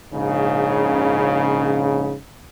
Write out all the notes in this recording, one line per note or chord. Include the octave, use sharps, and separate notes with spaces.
A#1 G#2 C#3